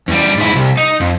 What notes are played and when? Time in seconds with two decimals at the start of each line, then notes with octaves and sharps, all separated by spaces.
0.08 E2 G3
0.38 G#2 E4
0.56 C2
0.77 D#4
1.00 F2